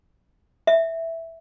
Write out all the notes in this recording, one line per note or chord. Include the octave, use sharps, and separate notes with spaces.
E5